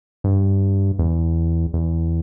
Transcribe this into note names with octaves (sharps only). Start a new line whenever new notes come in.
G2
E2
E2